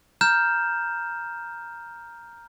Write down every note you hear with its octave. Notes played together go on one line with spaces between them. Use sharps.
A#5 F6 G6 E7